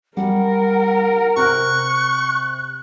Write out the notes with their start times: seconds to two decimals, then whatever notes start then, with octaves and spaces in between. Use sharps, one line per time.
0.17 G3 A#4 F#5
1.37 C3 C#6 F6 F#6